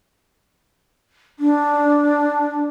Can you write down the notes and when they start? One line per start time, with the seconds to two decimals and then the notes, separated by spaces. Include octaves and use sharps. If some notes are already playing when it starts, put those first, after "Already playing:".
1.39 D4